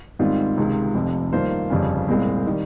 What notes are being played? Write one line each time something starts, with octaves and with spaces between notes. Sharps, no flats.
G#2 D#3 G3 C4 F4
C#2 C3 D#3 G#3
F1 F2 C3
G2 D#3 A#3 F4 C5
G1 F2 C#3 G3 C#4
C2 A#2 G#3 C4
D#3 G3